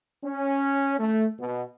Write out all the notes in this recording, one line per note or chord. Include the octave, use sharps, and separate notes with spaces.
C#4
A3
B2